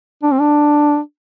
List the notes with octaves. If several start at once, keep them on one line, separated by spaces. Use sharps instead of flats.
D4
C4
D4